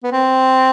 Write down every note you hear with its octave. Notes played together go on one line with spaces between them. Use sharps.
B3
C4